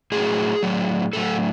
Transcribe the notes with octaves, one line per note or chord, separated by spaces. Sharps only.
A2 F#3 G#4
A2 F#3
A2 F#3 A4